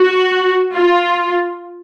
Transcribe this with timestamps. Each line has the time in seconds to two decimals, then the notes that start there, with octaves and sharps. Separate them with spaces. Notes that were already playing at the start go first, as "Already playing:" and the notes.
Already playing: F#4
0.73 F4